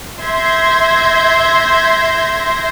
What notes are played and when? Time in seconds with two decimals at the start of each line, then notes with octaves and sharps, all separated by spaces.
0.22 E5 C6 G6 G#6 A#6